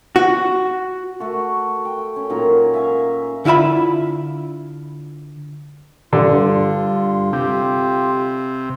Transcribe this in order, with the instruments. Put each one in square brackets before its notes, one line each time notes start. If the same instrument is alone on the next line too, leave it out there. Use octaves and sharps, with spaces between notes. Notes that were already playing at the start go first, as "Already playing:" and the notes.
[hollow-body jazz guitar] F#4
[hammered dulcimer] A3 F#4 A4
G5
C#4
A#2 D#3 F#3 A#5
E5 F5 G#5 A#5
[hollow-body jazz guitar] D3 E4 F4 E5 B5
[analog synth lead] G2 [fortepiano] D3 [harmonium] F4
[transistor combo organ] C3 [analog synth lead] G4